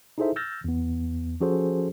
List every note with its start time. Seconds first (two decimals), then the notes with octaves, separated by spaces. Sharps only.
0.18 D#4 E4 G#4 A4 C5 E5
0.36 E6 F6 G6 A6 A#6
0.64 E2 B3
1.41 F3 C#4 F#4 G#4 A4 C5